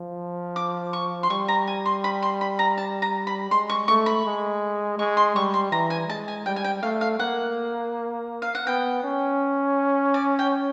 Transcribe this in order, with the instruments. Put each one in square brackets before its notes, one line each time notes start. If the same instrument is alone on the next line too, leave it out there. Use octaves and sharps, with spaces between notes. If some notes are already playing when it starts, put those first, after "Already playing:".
Already playing: [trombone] F3
[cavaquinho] D6
C#6
C6
[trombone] G3 [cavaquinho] C#6
[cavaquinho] A#5
G#5
C6
B5
C6
B5
A#5
A5
A#5
B5
[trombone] G#3 [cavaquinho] C6
[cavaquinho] C#6
[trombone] A3 [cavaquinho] C#6
[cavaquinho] B5
[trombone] G#3
[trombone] G#3 [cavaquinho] C#6
[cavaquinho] C6
[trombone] G3 [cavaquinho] C#6
[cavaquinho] C6
[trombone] E3 [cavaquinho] A#5
[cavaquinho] G#5
[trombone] G#3 [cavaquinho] A5
[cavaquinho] G#5
[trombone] G3 [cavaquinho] G5
[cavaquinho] G#5
G5
[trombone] A3 [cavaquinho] F5
[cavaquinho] F5
[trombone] A#3 [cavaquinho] F#5
[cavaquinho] F5
F#5
[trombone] B3 [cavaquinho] G5
[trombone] C#4
[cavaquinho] D5
G5